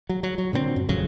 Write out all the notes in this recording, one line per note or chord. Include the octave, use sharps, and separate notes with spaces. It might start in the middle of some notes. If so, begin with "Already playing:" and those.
F#3
F#3
F#3
A#2 D3 A#3 C4
F#2
A1 F2 C#3 F#3